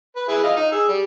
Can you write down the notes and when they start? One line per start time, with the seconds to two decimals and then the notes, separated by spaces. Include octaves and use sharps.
0.16 B4
0.28 E4 G#4 B4
0.44 F4 D#5 F5
0.56 D#4
0.72 G#4 E6
0.88 G3